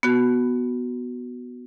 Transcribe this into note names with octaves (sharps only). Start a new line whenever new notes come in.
B3 F#4